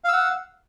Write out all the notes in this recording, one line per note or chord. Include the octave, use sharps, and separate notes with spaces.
F5 F#5 E6